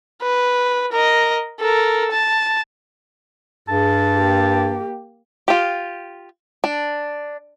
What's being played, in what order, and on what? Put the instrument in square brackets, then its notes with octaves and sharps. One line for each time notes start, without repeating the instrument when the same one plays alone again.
[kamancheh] B4
A#4 D#5
A4 A#4
A5
[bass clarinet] G2 [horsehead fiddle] G#4 [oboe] A5
[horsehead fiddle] A#3 G4
[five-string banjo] F4 G4
D4